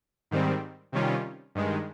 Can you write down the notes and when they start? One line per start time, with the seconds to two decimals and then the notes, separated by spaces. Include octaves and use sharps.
0.31 G#2 D#3 G3 C4
0.92 C3 D#3 G3 C#4 F4
1.55 G2 D#3 G#3